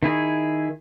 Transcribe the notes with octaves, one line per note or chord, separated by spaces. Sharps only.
D#3 E4 G#4